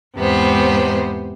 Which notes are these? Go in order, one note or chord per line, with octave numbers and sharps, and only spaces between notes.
E2 G#2 C3 B3 C5